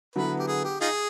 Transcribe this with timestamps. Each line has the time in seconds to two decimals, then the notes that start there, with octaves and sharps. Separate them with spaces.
0.16 D3 F#3 B3 E4 A4 B4
0.39 G4
0.48 G#4
0.64 G4
0.81 D#4 F4 G#4